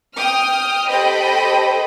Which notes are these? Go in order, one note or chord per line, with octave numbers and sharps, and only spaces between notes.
G5 D#6 F6
G4 A4 C5 D#5 G5 B5